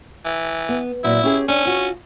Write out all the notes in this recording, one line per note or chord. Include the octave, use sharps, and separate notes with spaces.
E3
B3
A#2 F#3 C4 E4
C#4 G4 G#4
C#4 D4
F4 F#4